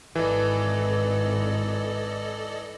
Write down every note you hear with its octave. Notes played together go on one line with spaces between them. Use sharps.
G#1 E3 A4 D5 D#5